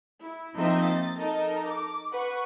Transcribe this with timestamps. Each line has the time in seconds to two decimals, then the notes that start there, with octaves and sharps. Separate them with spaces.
0.20 E4
0.55 F3 A#3 C4 D#4 D#5 E5
0.85 A6
1.18 D#4 A4 A#4 D#5
1.68 D6
2.12 B4 F#5 C#6